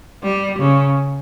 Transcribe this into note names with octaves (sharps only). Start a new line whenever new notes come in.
G3
C#3